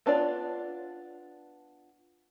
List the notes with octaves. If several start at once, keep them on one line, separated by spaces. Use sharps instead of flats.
B3 D4 F4 D5